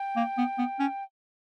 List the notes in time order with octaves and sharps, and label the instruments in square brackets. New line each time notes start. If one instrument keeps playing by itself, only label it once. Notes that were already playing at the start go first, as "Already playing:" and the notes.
Already playing: [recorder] G5
[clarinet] A#3
B3
B3
C#4